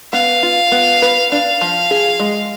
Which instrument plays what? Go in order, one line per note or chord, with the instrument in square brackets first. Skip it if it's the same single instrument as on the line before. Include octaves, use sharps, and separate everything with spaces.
[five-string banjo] B3 [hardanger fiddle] F5
[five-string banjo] F4
B3
B4
[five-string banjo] D4 [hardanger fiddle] F5
[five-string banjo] F3
G#4
G#3